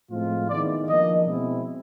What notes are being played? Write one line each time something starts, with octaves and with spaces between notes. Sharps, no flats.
A2 F3 G#3 C4 F4
D#3 G#3 B3 E4 D5
F3 A#3 D4 D#5
B2 G#3 C4 E4